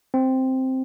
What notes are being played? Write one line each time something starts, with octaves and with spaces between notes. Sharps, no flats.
C4